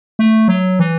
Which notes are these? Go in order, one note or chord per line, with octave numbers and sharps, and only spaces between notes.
A3
F#3
E3